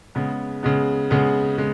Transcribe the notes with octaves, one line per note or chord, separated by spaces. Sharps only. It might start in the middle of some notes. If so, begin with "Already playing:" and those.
C#3 G#3 B3
C#3 G#3 B3
C#3 G#3 B3
C#3 G#3